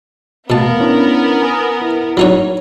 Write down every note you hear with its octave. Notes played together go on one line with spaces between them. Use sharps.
E2 B2 A3 B3 A#4 F5 A5
C#4 D4 E4
B4 G#5 D#6
E4
F#3 D#4 C#5